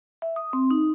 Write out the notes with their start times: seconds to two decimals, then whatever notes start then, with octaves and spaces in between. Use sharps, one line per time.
0.22 E5
0.36 D#6
0.53 C4
0.71 D#4